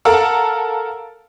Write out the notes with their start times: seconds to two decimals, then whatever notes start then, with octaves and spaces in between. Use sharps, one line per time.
0.05 A4 A#4 F5 F#5 A5 E6